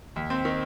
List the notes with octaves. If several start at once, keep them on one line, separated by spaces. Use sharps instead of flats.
D#2
C4
D#3